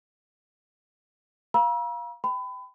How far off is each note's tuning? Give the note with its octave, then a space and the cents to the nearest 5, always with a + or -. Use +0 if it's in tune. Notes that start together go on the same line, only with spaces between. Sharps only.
F5 +0 A#5 +45 E6 +0
G5 +0 B5 +30